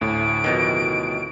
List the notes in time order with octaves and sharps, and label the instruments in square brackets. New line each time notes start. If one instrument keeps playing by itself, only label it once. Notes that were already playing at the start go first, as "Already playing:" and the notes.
[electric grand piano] D2 A2 [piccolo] D7
[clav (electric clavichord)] F2 B2 D#3